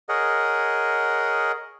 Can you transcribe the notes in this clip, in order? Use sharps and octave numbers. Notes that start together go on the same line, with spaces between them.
G#4 A#4 C#5 D#5 F#5